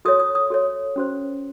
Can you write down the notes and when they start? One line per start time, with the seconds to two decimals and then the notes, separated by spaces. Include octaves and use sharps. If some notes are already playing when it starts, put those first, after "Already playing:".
0.05 F#4 A4 C#5 D#6
0.20 D#6
0.35 D#6
0.50 F#4 A4 C#5
0.96 C#4 F#4 C5